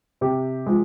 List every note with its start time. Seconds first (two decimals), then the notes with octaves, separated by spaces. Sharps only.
0.21 C3 G4
0.66 F3 G#3